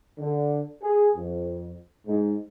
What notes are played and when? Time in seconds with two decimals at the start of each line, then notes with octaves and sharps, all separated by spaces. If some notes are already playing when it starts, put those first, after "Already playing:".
0.19 D3
0.82 G#4
1.16 F2
2.07 G#2